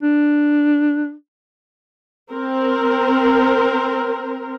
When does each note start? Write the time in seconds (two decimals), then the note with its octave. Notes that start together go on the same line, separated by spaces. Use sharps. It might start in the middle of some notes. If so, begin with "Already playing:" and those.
0.03 D4
2.32 C4 A#4